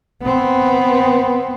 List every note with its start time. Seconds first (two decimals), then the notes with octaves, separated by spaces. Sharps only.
0.22 B3 C4